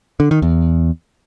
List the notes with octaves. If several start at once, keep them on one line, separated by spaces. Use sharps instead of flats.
D3
D#3
E2